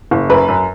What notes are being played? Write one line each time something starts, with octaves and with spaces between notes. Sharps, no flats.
F#1
F#2 B4
F#2